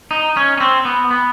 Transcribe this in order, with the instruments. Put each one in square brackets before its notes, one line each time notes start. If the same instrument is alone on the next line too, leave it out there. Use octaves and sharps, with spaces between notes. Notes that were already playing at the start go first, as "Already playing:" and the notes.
[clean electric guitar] D#4
C#4
C#4
C4
B3
B3